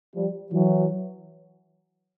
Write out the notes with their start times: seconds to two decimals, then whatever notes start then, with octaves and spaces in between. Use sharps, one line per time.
0.15 F3 G3
0.52 E3 F#3